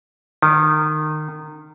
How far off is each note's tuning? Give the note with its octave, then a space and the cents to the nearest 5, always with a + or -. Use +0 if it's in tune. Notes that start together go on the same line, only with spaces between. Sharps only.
D#3 -25